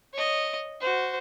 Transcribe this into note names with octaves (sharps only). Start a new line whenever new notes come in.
C#5 D#5
F#4 C5